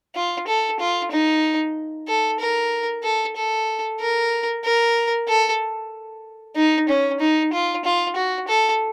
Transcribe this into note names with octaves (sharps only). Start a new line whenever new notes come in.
F4
A4
F4
D#4
A4
A#4
A4
A4
A#4
A#4
A4
D#4
C#4
D#4
F4
F4
F#4
A4